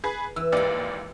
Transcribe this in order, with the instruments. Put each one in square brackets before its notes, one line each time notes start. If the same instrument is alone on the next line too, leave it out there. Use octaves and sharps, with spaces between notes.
[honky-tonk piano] G#4 B4
[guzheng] E3 [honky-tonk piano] E6
[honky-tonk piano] G#1 D#2 D5 [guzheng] G#3 G4